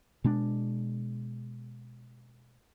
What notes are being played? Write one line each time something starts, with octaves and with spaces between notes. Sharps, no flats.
B2 G#3 D4